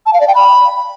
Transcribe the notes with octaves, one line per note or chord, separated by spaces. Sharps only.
A5
F5
D5
G5
B5